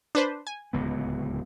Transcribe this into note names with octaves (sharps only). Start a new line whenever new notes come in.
D4 B4 C5
G#5
D1 C#2 B3